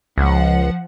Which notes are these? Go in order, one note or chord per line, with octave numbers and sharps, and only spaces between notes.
C#2 F3 F#5